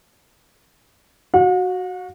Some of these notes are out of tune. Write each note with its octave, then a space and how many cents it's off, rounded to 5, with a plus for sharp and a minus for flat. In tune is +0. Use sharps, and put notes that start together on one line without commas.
F#4 +0 F#5 -45